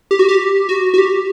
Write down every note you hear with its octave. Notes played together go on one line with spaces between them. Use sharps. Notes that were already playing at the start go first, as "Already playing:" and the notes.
G4
F#4
G4
F#4
F#4
G4